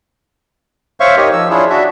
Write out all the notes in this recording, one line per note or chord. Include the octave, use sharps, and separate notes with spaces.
C5 C#5 E5 F5 C#6
D#4 G4 A#4 C#5 D#5
F3 E6
D4 E4 F4 G#4 C#5
D4 F#4 E5